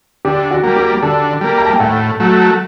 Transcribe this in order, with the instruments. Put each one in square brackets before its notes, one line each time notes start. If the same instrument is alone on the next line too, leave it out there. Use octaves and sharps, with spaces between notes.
[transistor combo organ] D3 [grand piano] G4
[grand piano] F#4
[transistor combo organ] G3 A#3
[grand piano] G4
[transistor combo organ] D3 [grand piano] A4
[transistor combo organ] G3 A#3
[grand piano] A#5
A5
G5
[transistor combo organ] A2 [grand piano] F#5
[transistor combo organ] F#3 A3